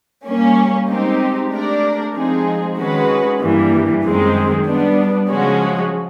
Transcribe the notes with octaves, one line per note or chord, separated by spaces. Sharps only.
G3 A#3 C#4
G#3 C4 D#4 G4
A3 D4 G4 A#4 D5
F3 G#3 C4 D#4 G#4
D#3 G#3 C#4 F#4 B4
G2 E3 G3 A#3
F#2 D#3 G#3 C4
G3 B3 D4
C#3 F3 G#3 C#4 F#4